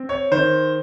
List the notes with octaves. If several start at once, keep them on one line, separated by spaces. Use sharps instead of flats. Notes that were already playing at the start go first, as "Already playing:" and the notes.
Already playing: C4
C#5
D#3 C5